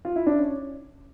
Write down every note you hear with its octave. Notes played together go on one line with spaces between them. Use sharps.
F4
E4
D4
C#4